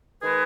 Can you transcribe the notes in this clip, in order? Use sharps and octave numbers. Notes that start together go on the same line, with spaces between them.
D#3 G#3 G#4 B4